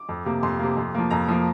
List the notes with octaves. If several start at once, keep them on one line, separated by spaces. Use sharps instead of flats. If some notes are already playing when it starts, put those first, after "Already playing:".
Already playing: D6
F2
C3 A#3
F2 C6
C3 A#3
F2
F3 A#3
F2 A#5
F3 A#3